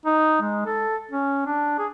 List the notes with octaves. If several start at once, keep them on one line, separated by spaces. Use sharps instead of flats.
D#4
G#3
A4
C#4
D4
G#4